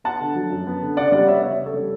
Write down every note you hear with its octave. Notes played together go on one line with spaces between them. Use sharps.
B3 F#5 A5
D3
F#3
F#2
B3
D3
C#3 D5 F#5
G3 D5 F#5
B3 C#5 E5
C#3 C#5 E5
C#3
A4 C#5
G3